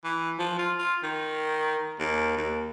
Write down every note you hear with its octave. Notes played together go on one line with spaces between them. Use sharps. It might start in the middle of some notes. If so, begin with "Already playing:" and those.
E3
F3
F4
F4
D#3
D#2
D#2